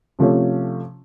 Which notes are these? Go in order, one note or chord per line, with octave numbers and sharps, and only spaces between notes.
C3 F3 A3 C#4